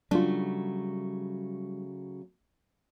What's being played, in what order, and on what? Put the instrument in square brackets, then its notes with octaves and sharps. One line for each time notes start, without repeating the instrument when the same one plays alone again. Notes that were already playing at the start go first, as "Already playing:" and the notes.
[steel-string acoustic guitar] C#3 F#3 A3 [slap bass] G3 [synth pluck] D4 F4